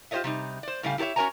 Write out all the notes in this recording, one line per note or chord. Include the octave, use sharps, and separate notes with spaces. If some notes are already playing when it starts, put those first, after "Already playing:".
F4 G4 C5 C#5 D#5 E5
C3 G3 D#4
C5 D5
A2 C#3 G3 A3 F5 G#5
E4 G4 A4 C#5 E5
C#4 F#4 A#4 C#5 G#5 A#5